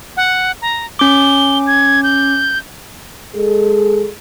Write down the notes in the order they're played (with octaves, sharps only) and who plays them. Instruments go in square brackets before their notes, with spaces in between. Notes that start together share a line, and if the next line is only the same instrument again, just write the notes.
[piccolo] F#5
A#5
[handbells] C#4 D6 [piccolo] G7
[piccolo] G#6
G6
[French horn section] G#3 G#4 A4